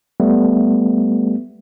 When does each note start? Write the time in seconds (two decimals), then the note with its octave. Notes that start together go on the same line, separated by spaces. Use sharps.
0.20 G3 A3 B3